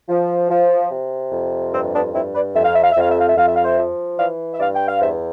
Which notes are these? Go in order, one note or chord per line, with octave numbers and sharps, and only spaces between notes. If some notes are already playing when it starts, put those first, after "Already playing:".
F3
F3
C3
F2
G2 C4
B3 D4
G2 C4 E4
B4 D5
F2 E5
F5
E5
F5
E5
F2 F5
E5
F5
E5
F2 F5
E5
F5
C5 E5
F3
E3 D5 F5
E5
G2 D5 F5
G5
F5
E2 C5 E5